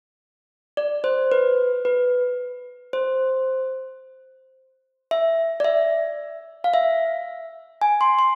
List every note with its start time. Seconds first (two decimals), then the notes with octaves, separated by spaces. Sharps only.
0.77 D5
1.04 C5
1.32 B4
1.85 B4
2.93 C5
5.11 E5
5.60 D5
5.64 E5
6.64 F5
6.74 E5
7.82 G#5
8.01 C6
8.19 C6